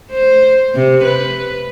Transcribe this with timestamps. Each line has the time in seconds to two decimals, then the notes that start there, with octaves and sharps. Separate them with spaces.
0.11 C5
0.75 C3
1.04 B4